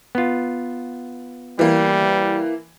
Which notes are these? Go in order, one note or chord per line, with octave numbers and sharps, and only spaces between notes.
B3 F4
E3 G3 A#3